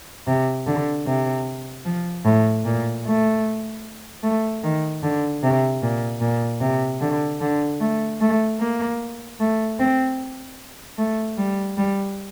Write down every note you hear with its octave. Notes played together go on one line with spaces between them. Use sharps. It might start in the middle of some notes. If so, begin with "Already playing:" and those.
C3
D3
C3
F3
A2
A#2
A3
A3
D#3
D3
C3
A#2
A#2
C3
D3
D3
A3
A3
A#3
A3
C4
A3
G3
G3